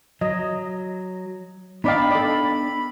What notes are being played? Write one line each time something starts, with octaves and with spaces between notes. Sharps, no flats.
F#3 D#5
B3 D4 D#4 D5 F5 G5 B5
A4 D5